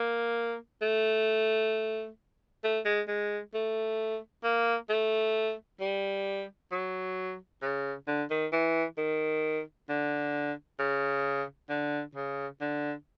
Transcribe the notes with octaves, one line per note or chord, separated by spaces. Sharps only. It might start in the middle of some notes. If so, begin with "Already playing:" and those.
Already playing: A#3
A3
A3
G#3
G#3
A3
A#3
A3
G3
F#3
C#3
D3
D#3
E3
D#3
D3
C#3
D3
C#3
D3